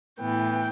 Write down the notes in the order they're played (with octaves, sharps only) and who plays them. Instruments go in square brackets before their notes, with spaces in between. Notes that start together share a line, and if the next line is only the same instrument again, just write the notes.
[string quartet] A2 E3 B3 G5